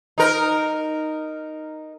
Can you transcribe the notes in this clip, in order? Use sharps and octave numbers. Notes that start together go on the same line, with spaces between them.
D#4 A#4